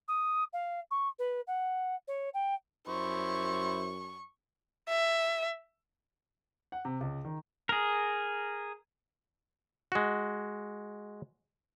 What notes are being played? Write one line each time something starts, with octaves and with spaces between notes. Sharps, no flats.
D#6
F5
C#6
B4
F#5
C#5
G5
F#2 E4 C5 C#6
E5
F#5
C3
C#2
D#3
G#4 A#4
G#3 F#4